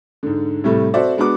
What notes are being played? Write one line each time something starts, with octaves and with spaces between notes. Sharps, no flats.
G#2 D3
A2 C3 G3 A3
C4 F#4 A4 C5 D5 E5
G#3 B3 D4 F#4 D6